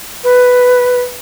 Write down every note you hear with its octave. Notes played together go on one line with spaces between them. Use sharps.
B4